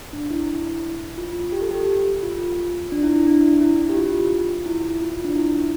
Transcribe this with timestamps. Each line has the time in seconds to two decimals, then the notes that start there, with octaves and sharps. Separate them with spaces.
0.13 D4
0.31 E4
1.18 F4
1.52 G4
1.62 A4
1.71 G4
2.22 F4
2.92 D4
3.03 E4
3.16 E4
3.27 D4
3.61 E4
3.90 G4
3.97 F4
4.66 E4
5.01 F4
5.24 D4
5.36 E4